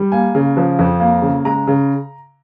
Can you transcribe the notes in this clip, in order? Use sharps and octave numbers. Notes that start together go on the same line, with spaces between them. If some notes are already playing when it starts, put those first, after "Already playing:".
Already playing: G3
A#3 G#5
C#3
F3
F2
A#3
C#3
G#3 A#5
C#3